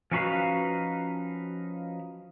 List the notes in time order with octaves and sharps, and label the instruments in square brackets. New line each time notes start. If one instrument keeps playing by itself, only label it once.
[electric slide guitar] F3 C#4 D#4 F#4 B4 F5